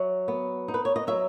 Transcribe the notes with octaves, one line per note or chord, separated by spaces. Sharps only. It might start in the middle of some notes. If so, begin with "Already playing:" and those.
Already playing: F#3 E5
B3
D#4
B4
C#5
D#5
F#3 E5